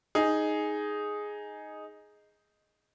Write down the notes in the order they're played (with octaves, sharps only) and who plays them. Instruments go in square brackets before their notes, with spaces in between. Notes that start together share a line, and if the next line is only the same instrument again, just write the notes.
[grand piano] D#4 G#4